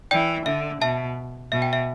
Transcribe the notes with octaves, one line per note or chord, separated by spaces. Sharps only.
E3 D5 G5
D3 E5
B2 E5 A5
B2 E5
G5
E5